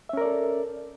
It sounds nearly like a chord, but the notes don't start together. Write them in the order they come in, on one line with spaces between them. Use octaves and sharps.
E5 C#4 A#4 D5 A4